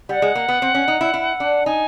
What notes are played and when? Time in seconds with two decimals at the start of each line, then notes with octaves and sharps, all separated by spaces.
0.09 G3 F#5
0.22 G#3
0.35 A#3
0.49 B3
0.62 C4
0.75 C#4
0.88 D#4
1.01 E4
1.14 E4
1.40 D4
1.66 D#4 G#5